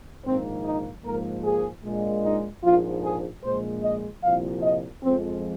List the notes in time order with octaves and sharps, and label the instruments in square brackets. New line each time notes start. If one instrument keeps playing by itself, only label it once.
[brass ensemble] A#1 G#2 D#3 A#3 C4
D#4
G#2 F3 A#3 A#4
G#4
A#1 A#2 G#3
D#4
A#1 G#2 F3 F4
G#4
A#1 A#2 G#3 C5
D#5
C2 A#2 F3 F5
D#5
F2 F3 G#3 C4